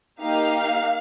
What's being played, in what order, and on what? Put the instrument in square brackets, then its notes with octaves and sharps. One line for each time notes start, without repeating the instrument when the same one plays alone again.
[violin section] A#3 D#4 G4 F5